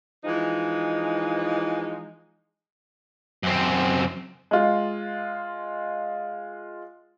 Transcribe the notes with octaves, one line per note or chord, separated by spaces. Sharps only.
E3 F3 G#3 D#4
F#2 C4
G#3 F4